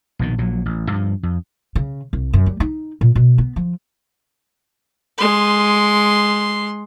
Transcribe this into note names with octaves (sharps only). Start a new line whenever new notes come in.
A#1 B2 D#3
A#1 A#2 F#3
A1
G2 F3
F2
C#3
C2
F#2
G3
D#4
A#2
B2
B3
F3
G#3 C6